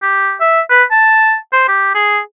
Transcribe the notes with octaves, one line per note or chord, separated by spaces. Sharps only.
G4
E5
B4
A5
C5
G4
G#4